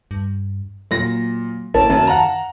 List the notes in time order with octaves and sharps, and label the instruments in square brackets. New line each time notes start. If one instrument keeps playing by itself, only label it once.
[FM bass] G2
[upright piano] A#2 A#6 [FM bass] F#3
[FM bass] A1 [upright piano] A#3 C#4 E4 [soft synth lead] A5
[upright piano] F#2 [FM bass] D#3
[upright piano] F5 F#5 A#5